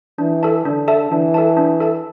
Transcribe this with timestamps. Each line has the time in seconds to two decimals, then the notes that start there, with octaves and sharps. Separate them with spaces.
0.18 E3 D4
0.43 A4 E5 A5
0.65 D3 D4
0.88 A4 E5 A5
1.11 E3 D4
1.34 A4 E5 A5
1.57 D4
1.80 A4 E5 A5